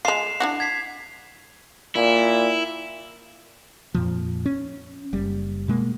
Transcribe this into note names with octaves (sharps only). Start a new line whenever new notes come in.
G#3 F4 C7 E7 F7
D4 E4 F#4
G#6 B6 C7
A#2 E4
F2 A#2 F3
C#4
F#1 G3
B2 G#3 A#3